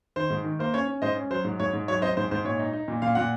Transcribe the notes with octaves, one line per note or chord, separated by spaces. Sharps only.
D#3 C5
G#2
D#3
A#3 C5
C#4 C#5
C#4
G#2 C5 D#5
C#4
F#3 C5
G#2
G#2 C#5
G#2
F#3 C#5
C4 C5 D#5
G#2 C5
G#2 C5
A#2 C#5
D#4
D#4
A#2
A#2 F5
A#2 F#5